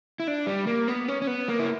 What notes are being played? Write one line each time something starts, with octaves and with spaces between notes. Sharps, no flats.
E4
D4
G3
A#3
B3
C#4
C#4
B3
A#3
E4